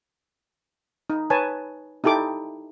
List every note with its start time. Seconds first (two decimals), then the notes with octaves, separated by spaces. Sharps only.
1.10 D#4
1.30 B4 C#5 G#5 A5
2.04 D#4 E4 G4 A4 D6